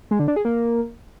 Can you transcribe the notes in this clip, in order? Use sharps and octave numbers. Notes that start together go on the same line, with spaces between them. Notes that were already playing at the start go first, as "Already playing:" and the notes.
G#3
D3
D4
G#4
A#3